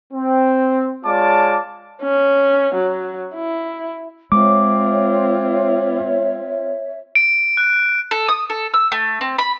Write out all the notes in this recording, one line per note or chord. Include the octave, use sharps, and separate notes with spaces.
C4
G#3 F4 C#5 D5 A5 D6
C#4
F#3
E4
G#3 C4 F4 C#5 E5 D6
D7
F#6
A4
D#6
A4
E6
A3
C4
B5